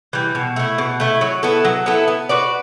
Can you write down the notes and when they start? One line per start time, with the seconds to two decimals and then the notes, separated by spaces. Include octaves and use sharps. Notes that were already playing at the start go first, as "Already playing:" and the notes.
0.13 E3 G3
0.35 B2
0.56 A3 E4
0.78 B2
1.00 A3 E4
1.21 F#3
1.43 B3 E4 A4
1.65 F#3
1.86 B3 E4 A4
2.08 B3
2.29 F#4 B4 D5